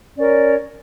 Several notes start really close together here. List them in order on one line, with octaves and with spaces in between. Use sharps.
C#4 D5 A#4 C#5